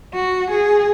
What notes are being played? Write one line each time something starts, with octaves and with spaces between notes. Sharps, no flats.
F#4
G#4